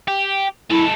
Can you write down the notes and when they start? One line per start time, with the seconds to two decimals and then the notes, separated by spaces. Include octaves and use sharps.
0.08 G4
0.70 G#3 E4 A4